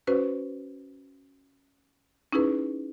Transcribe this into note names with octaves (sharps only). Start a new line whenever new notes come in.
C#4 F#4 B4 C5
C#4 D#4 E4 G#4 B4